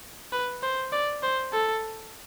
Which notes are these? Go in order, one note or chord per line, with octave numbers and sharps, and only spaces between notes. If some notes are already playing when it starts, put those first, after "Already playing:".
B4
C5
D5
C5
A4